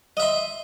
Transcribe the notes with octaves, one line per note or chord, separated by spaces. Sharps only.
D#5 E5 C6